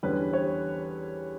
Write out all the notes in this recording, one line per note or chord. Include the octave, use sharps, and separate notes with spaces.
E2 D3 G3 C#4 B4
C#5